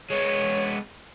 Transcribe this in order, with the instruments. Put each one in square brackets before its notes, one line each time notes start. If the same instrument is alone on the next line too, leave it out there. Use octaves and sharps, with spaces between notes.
[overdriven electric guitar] G#3 B3 [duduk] C#5